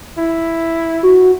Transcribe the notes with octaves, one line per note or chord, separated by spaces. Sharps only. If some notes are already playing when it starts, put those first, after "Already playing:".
E4
F#4